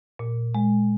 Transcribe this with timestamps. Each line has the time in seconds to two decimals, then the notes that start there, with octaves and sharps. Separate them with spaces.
0.19 A#2
0.55 G#3